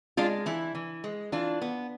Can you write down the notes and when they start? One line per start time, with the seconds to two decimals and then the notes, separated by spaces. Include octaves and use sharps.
0.17 G#3 D4 F4
0.46 E3 E4
0.75 E3
1.04 G#3
1.32 E3 D4 F4
1.62 B3